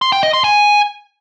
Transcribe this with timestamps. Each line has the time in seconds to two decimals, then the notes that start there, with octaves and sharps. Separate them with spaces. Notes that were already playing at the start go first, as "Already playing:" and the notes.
0.02 C6
0.12 G5
0.23 D#5
0.34 C6
0.44 G#5